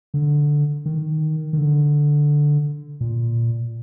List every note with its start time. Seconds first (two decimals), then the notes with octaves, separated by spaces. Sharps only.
0.14 D3
0.85 D#3
1.53 D#3
1.57 D3
3.01 A#2